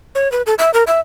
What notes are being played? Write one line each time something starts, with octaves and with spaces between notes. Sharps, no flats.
C#5
B4
A4
E5
A#4
E5